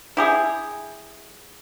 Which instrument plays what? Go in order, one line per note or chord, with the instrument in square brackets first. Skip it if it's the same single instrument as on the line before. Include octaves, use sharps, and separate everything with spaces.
[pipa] E4 G4 G#4